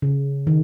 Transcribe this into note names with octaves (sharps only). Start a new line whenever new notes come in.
C#3
D#3